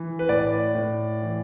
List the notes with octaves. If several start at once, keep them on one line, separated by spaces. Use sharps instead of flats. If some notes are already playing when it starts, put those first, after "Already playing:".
Already playing: E3
B4
A2 D5
A2
E3